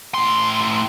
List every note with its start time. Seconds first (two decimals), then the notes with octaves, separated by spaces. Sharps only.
0.14 A2 C6